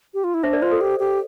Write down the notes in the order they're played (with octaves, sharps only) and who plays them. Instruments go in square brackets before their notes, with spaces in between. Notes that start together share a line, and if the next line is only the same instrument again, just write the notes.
[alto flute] G4
F4
E4
[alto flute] D4 [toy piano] C5 E5
[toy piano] A#4 D5
[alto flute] F4 [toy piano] C5
[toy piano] A4
[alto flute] G4
G4